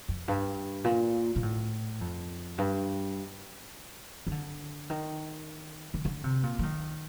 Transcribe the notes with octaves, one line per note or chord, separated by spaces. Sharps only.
F2
G2
A#2
A#2
A2
F2
G2
D#3
D3
D#3
D#3
D3
C3
A#2
F3
D#3